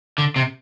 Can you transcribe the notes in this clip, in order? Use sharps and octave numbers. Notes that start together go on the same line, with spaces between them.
D3
C3